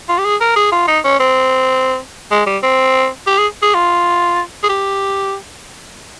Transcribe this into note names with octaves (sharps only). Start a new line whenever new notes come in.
F4
G4
G#4
A#4
G#4
F4
D#4
C#4
C4
G#3
G3
C4
G4
G#4
G#4
F4
G#4
G4